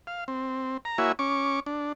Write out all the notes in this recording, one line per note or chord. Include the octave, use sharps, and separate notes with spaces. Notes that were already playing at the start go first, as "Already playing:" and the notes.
F5
C4
A#5
A#3 E4 F#4 C#5 E5 G#5
C#4 C#6 D6
D4